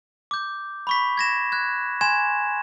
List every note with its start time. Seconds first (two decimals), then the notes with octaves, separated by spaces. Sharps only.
0.31 D6 G6
0.87 B5 C#6 B6
1.17 G#6 A#6 E7
1.52 F#6 G#6
2.01 G#5 C6 G#6 E7